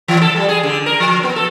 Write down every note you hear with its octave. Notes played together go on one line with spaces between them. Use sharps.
E3
A4
G3
G#4
D3
A#4
F3
B3
A4